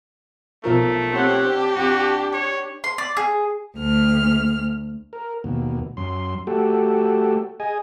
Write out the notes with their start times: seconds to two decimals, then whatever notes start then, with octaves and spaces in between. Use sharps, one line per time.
0.64 B1 F3 A3 A#4
1.12 C4 G4 C#5 F#5
1.45 D4
1.75 F2 F#4
2.33 C#5
2.84 C6
2.98 D5
3.17 G#4
3.77 D2 F6
5.13 A#4
5.44 D#2 B2
5.97 F#2 C6
6.47 A3 F#4 G4 A4
7.60 G#4 D#5 G#5